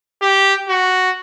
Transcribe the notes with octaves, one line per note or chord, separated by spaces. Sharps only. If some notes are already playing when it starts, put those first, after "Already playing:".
G4
F#4